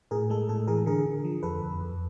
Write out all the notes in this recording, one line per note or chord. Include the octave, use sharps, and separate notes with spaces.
A2 G#4 A#4
G#3 A4
A2 A4
E3 G#4 A#4
D3 G#4 A#4
D3
F3
F2 A4 B4
F2
F2